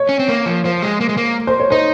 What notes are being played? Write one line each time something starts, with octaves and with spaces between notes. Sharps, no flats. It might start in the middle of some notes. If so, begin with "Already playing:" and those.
Already playing: C#5
C#4
C4
A#3
F3
F3 C5
G#3
A#3
G#3
A#3
C5
C#5
D#4 C5